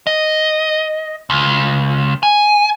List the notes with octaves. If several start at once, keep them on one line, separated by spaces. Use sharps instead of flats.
D#5
C#2
G#5